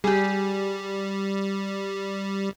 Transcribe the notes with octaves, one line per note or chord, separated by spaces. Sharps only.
G3 G4 G#4